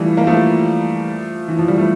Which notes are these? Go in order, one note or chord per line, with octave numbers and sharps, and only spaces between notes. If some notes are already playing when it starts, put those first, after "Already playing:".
Already playing: E3 F3 G3 A3
A#3
F3 A3
E3
F3
G3
A3